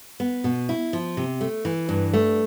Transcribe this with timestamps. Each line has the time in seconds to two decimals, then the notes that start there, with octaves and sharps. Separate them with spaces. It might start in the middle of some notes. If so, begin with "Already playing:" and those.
0.20 B3
0.44 B2
0.69 E4
0.93 F3
1.17 C3
1.41 A3
1.65 E3
1.89 G2
2.13 A3